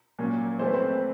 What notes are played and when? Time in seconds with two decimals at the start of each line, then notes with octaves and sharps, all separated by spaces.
0.19 A#2 F#3 A#3 C#4
0.59 E3 A3 C4 C5
0.67 B4
0.74 C4 C5